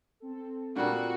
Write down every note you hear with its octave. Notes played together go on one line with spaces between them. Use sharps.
C4 A4
A#2 G3 A#3 D4 F#4